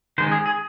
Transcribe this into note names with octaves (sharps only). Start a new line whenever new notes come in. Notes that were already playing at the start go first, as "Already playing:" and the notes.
D#3 G#3 C#4 C5
G#4
G#4